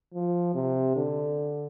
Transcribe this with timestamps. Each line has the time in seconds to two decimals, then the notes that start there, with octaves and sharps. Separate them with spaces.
0.14 F3
0.55 C3
0.96 D3